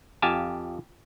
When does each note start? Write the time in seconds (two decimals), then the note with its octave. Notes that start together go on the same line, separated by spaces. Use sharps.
0.22 F2 G4 F5 G#5 A5